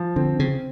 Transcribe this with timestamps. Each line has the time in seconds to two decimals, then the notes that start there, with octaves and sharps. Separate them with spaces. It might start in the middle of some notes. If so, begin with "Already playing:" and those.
Already playing: F3
0.16 D3 C4
0.39 C#3 C4